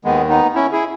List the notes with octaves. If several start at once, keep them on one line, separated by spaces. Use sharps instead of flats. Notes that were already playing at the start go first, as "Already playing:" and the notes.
D#2 D#3 G#3 B3
B3 D#4
C#4 E4
E4 G#4